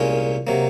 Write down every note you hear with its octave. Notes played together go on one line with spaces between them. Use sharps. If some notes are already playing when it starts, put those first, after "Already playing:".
Already playing: C2 A#2 G#3 C#4 F4
C3 F#3 A#3